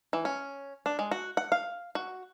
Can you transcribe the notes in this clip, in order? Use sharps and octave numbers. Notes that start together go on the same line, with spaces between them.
E3
C#4
D4
G#3
F#4
F#5
F5
F#4